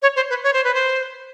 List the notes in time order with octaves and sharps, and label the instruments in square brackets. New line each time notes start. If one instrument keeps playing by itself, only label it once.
[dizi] C#5
C5
B4
C#5
C5
B4
C5